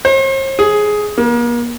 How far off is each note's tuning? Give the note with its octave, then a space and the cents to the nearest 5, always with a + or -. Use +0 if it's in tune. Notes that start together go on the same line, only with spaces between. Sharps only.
C5 +45
G#4 +10
A#3 +40